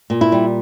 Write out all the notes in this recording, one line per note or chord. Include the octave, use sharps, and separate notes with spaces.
A#2
E4
G3